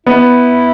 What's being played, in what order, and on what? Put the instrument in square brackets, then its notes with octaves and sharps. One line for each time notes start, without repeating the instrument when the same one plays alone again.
[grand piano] B3 [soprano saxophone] E4